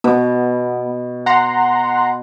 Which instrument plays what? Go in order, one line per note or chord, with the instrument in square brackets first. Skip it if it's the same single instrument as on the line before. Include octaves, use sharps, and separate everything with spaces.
[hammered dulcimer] B2 [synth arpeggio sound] B3
[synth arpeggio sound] F#5 A#5 C6